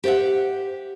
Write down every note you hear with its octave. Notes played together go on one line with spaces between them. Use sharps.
G4 C5 D5 E5 F#5